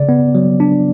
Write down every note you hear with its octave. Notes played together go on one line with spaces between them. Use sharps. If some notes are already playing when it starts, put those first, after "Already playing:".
Already playing: C#3 D5
B3
F#3
D4